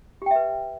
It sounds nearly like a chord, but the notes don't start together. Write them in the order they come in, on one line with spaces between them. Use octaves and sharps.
G4 G5 E5 B4